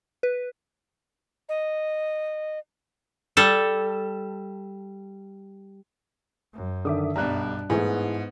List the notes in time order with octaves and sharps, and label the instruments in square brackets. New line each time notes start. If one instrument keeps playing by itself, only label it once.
[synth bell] B4
[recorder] D#5
[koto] G3 A4
[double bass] F#2
[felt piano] D3 D#3 [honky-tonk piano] E5 D6 D#6
[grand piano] B1 G3 [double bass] G2 D4 [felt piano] A#5 F#6
[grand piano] G#2 [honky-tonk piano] E3 A3 [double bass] B3 [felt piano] G#4 B4 G#5